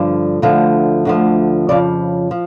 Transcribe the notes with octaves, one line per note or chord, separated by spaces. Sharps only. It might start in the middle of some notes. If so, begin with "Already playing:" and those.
Already playing: G2 D3 F3
D2 D3 F3
D2 D3 F3
F2 C#3 F3 D5
F3